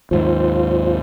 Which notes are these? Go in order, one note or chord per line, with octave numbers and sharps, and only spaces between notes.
D#2 G#2 F4 C5